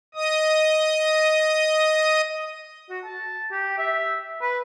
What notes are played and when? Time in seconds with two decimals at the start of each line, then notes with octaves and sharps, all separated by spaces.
0.15 D#5 D#6
2.89 F#4
3.05 A5
3.51 G4
3.78 E5
4.42 B4